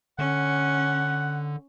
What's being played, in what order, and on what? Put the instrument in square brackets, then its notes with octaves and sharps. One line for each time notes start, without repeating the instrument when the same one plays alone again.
[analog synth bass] D3 [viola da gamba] C#4 [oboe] F#5